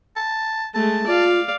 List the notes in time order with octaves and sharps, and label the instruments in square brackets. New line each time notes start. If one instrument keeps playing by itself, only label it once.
[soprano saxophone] A5
[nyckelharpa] G#3 A3 [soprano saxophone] A5
[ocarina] F4 [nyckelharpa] D5 F5